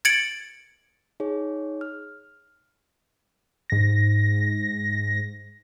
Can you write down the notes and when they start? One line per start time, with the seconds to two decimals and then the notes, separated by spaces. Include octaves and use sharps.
0.05 G#6 A6 C#7 D7 F#7
1.20 D#4 G#4 C#5
1.81 F6
3.70 G#2 A#6